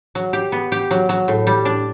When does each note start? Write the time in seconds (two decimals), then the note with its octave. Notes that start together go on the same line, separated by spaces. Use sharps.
0.15 F#3
0.33 G4
0.52 B3
0.72 G4
0.91 F#3
1.09 F#3
1.28 A2
1.47 G3
1.65 D4